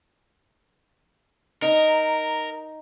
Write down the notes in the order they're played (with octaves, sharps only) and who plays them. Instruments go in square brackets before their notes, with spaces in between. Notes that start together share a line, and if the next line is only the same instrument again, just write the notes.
[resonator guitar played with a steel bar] D#4 [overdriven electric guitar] A#4